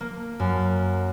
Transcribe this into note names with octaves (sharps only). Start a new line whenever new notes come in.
A#3
F#2